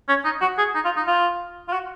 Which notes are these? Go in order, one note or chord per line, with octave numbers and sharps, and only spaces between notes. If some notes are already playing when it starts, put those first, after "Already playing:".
C#4
D#4
F#4
G#4
D#4
F4
D#4
F4
F4
F#4